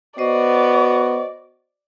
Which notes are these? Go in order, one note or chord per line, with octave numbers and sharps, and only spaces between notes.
B3 F#4 C5 D5 D#5